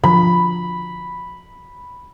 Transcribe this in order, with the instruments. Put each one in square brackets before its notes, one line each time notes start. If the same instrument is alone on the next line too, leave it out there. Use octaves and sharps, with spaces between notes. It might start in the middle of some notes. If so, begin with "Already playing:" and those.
[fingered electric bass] D3 F3 [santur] B5